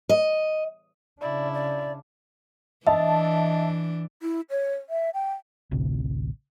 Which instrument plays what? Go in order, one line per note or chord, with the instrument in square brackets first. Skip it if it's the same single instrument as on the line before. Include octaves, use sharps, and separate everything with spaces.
[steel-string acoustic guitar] D#5
[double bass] C#3 D4 [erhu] E4 [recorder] D5
[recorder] D5
[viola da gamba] E3 D4 [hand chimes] D#5 [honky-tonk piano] E5 A5
[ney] E4
C#5
E5
G5
[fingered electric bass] A1 D2 C3